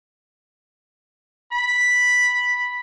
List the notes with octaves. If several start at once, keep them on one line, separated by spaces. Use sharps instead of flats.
B5